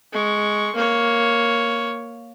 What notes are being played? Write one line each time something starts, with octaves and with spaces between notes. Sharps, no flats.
G#3 C#6
A#3 C#5